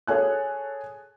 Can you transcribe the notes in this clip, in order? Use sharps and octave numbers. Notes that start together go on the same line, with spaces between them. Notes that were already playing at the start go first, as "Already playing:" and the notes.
G#4 A4 C#5 G#5 F#6